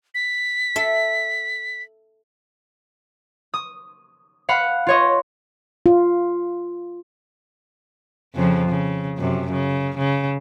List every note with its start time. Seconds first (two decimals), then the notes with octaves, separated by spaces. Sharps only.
0.15 B6
0.76 A4 E5
3.54 D#6
4.49 F5 F#5 B5 F#6
4.87 F4 C#5 D#5
5.86 F4
8.35 F2 C#3 F3
8.69 C#3
9.17 F#2 C3
9.51 C#3
9.98 C#3